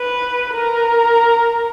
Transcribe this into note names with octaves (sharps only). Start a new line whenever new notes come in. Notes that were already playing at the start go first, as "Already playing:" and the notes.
Already playing: B4
A#4